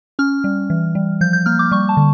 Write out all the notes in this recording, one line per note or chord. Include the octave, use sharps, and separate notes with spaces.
C#4 F6
G3
E3
G3
F3 G6
G6
A#3 F6
D6
G3 C#6
A5
D3